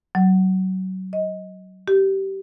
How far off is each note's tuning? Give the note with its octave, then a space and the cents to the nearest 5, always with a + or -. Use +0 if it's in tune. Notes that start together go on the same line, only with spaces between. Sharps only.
F#3 +25
D#5 +15
G4 -20